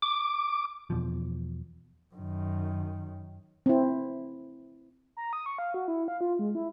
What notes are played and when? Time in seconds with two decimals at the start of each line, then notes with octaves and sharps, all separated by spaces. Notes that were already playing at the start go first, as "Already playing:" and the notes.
0.02 D6
0.90 E2 B2 F3
2.14 F#2 D#3
3.66 C4 E4
5.17 A#5
5.33 D#6
5.46 C#6
5.58 F5
5.74 F#4
5.88 E4
6.08 F5
6.21 F4
6.39 G#3
6.55 E4